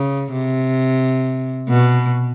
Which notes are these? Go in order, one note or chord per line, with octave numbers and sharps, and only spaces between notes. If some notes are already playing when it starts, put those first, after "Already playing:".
Already playing: C#3
C3
B2